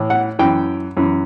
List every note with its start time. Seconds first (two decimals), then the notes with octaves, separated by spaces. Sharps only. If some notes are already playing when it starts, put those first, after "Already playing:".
Already playing: A2 E3
0.10 F#5
0.39 F#2 E3 G5
0.97 F#2 E3